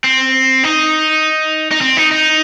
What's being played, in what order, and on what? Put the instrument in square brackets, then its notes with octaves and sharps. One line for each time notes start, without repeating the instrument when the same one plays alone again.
[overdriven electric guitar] C4
D#4
D#4
C4
D#4
D#4